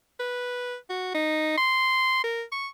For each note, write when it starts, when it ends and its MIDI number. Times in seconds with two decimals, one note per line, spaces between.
0.20 0.76 71
0.90 1.12 66
1.15 1.57 63
1.58 2.20 84
2.24 2.43 70
2.52 2.68 85